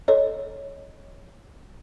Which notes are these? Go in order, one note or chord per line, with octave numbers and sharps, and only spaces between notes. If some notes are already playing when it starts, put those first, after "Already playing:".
A4 C#5 D#5